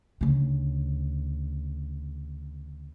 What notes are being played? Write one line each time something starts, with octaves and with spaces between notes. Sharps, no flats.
D2 C#3